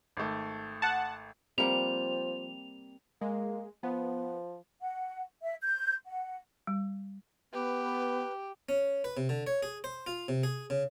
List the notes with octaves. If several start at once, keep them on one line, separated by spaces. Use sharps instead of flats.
G#1 A3
F#5 A5
F3 G3 A#3 C4 F#5 F7
G#3 A#3
F3 B3
F#5
E5
G6
F#5
G3
B3 G4 B4
C#4
B4
C3
D3
C#5
G#4
C5
F4
C3
G#4
C#3